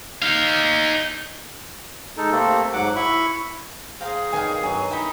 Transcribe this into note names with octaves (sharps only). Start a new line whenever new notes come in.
D#4 F5
G#3 D#4 A4
C3 A3 A#3 C4 A4
G#2 F#3 F#5 D6
E4 B5 C#6
G#4 C5 D#5 F5 G5 A#5
D#3 B3 D4 C#5 F5 G#5
G2 F#3 G#4
D#4 E4 G5 B5